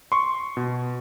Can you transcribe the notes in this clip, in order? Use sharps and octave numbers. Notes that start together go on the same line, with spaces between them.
C6 C#6
B2